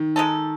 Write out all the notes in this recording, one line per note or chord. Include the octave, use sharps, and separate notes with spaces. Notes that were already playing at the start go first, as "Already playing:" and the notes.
Already playing: D#3
G#3 D#4 A4